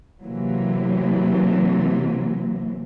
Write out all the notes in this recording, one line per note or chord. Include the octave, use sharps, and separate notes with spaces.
C3 E3 F#3 A#3